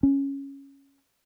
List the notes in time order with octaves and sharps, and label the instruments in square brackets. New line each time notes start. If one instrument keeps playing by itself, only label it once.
[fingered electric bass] C#4